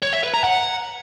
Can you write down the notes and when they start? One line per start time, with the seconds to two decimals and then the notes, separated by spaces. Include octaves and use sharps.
0.02 C#5
0.13 E5
0.23 B4
0.34 A#5
0.44 F#5